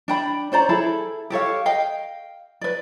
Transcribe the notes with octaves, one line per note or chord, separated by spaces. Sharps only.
D4 G5 B5
C#4 C5 D5 A#5
E4 G#4 A4 B5
G4 A4 C#5 F5
D#5 F5 G5
B4 D5